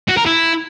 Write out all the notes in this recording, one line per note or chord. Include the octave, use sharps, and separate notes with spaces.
F#4
A#4
E4